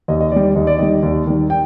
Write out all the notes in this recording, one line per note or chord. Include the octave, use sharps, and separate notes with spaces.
D#2 D#5
D#5
D#3 G3 D5
D5
D#2 D#5
D5
D#3 G3 D#5
D#2
D#3 G3
G5